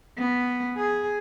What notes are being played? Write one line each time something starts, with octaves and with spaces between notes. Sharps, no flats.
B3
G#4